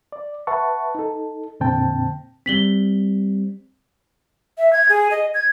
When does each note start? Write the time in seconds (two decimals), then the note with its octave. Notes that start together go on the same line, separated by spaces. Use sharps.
0.12 D5
0.47 B4 E5 F#5 A5 C#6
0.95 D#4 A4
1.60 F2 A#2 D3 C4 G5 A5
2.46 G3 C4 B6 F#7 G7
4.58 E5
4.73 G#6
4.89 G#4
5.11 D#5
5.34 G#6